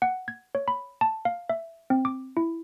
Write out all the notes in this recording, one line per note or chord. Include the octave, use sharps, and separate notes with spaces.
F#5
G#6
C#5
B5
A5
F5
E5
C4
D6
E4